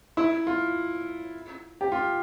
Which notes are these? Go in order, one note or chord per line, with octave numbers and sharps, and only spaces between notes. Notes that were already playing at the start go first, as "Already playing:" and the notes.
E4
F4
G4
F4